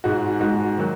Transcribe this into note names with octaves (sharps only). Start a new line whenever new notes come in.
G#2 G#3 F#4
G#2 G#3 F#4
D#3 F#3